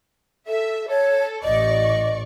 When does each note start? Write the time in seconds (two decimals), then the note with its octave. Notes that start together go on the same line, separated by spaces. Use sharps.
0.47 A4 E5
0.89 A4 C#5
1.43 A1 D5 D#5 C#6